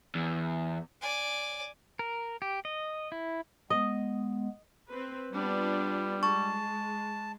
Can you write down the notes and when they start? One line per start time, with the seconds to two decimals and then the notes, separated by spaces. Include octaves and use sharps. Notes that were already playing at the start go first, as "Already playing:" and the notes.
0.15 E2
1.01 D5 G#5
1.99 A#4
2.42 G4
2.65 D#5
3.12 E4
3.70 G#3 B3 D#5
4.88 C4 B4
5.32 G3 B3 D4 F4
6.23 G#3 A5 C#6